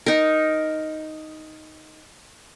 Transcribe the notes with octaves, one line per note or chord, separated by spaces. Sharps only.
D#4 A#4